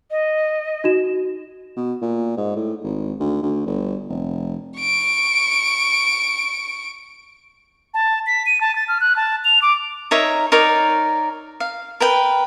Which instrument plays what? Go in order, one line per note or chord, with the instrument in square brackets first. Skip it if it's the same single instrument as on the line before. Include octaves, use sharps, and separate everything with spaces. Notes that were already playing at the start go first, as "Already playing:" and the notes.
[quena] D#5
[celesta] D#4 F#4 E7
[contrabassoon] B2
A#2
G#2
A2
G#1
D2
D2
G1
F1
[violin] C#6 D7
[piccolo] A5
B6
D#7
A5
A6
F6
F#6
A5
F7
D6
[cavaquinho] D#4 A#4 C#5 E5
D#4 A#4 C#5 D5
F5
A#4 B4 G5